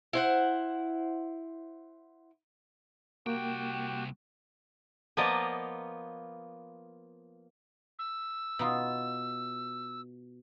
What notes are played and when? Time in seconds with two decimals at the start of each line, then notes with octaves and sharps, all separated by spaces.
0.13 E4 C5 F#5
3.26 C2 A#3 F#4 G4 G5
5.17 F3 A#3 B3 F4 D5 D#5
7.99 E6
8.59 B2 D#4 F4